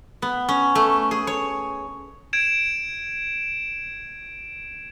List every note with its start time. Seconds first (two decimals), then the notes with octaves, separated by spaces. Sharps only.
0.22 B3
0.49 C#4
0.75 A3
1.11 G#4
1.27 C#5
2.33 G#6 D7 E7